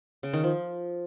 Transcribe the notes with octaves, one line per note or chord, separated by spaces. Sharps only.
C#3
D#3
F3